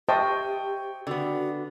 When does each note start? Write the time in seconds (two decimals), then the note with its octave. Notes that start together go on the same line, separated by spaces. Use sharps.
0.09 G4 C5 D#5 E5 G5 A5 C#6
1.07 D3 B3 F#4